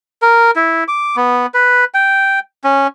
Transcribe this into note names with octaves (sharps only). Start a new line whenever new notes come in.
A#4
E4
D6
B3
B4
G5
C#4